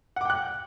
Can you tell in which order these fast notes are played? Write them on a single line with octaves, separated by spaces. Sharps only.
F#5 D6 G5 F#6